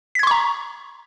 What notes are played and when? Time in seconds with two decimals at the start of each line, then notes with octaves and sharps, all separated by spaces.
0.15 B6
0.19 G#6
0.23 C6
0.27 C#6
0.31 A#5